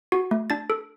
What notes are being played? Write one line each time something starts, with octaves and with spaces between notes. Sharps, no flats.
F#4
A3
D4 A6
A4